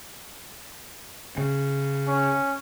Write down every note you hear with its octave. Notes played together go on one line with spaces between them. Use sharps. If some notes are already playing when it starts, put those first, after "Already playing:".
C#3
C#4